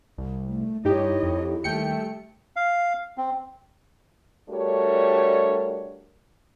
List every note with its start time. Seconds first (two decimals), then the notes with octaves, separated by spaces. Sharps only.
0.18 C2
0.47 A3
0.85 G2 D#4 E4 G4 C#5 D#5
1.23 F2
1.64 D#2 G3 A3 G5 C#7
2.56 F5
3.18 C4
4.49 G3 A3 D4 F#4 A#4 C#5